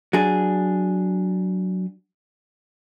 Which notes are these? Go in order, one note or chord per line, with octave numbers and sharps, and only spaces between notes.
F#3 D4 G#4